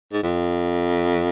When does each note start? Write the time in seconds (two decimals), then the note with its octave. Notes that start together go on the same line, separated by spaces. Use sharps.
0.13 G#2
0.23 F2